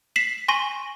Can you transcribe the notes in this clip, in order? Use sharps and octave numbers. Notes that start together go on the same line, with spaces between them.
B6 C7 E7 F#7
G#5 C6 C#6 A#6 D#7